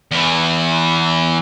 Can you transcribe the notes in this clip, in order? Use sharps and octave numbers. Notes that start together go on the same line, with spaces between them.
E2 E3